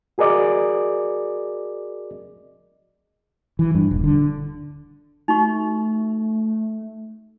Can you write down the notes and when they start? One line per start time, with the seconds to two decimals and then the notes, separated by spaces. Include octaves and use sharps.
0.18 F#4 G#4 A#4 D5 D#5 D6
3.59 E3
3.75 G2
3.91 D#1
4.04 D3
5.28 A3 D#4 F#4 C#6